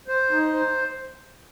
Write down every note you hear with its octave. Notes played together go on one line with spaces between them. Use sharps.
C5
D#4
C5